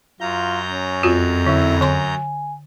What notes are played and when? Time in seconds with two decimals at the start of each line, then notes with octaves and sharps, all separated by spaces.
0.20 F#2 F4 A#5 G6
0.70 C#4
1.03 F2 F4 F#4
1.46 D3 E4
1.81 D3 G#5 C6